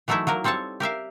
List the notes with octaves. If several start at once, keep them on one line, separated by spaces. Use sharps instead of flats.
E3 F#3 A3 D#4 E4 E5
F#3 A#3 A#4
G3 C4 A4 C#5 A5
G4 A#4 E5 F5